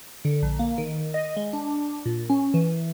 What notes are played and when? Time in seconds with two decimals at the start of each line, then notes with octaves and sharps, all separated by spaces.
0.25 D3
0.43 A#1
0.59 A#3
0.78 D#3
1.14 D#5
1.37 G#3
1.53 D4
2.06 A#2
2.30 C#4
2.54 E3